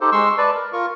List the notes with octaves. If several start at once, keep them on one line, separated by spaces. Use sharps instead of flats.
D#4 G4 A4 C5
G#3 C6 C#6 E6
B4 D5 A5
A#4
F4 A#4 C#6